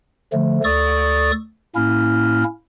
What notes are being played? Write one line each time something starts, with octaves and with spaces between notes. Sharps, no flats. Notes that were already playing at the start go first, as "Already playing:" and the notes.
D3 F3 A3
D2 A4 D5 C#6 D#6 A6
A2 A#3 C#4 E4 F6